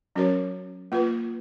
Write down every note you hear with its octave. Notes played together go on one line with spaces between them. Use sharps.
F#3 C#4 F#4 A#4 C#5
A#3 F4 B4